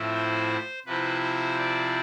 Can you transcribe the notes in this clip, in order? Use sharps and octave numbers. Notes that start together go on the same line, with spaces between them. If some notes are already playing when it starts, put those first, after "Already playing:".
Already playing: A2 F3 C4 E4
C5
C3 F3 C4 E4 B4
C5
D5